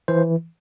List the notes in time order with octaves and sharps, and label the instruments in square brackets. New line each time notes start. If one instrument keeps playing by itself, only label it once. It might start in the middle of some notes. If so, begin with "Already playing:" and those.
[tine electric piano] E3 C5